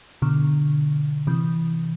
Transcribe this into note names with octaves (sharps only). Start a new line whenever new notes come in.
B2 D3
C3 E3